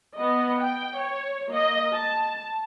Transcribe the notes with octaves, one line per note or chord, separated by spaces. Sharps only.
B3 D#5
G5
C#5
A#3 D#5
A5